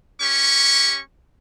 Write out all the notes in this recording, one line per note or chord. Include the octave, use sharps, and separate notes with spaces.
C#4 G4 C#6